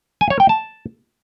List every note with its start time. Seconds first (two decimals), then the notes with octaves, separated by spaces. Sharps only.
0.21 G#5
0.30 C#5
0.40 G5
0.49 A5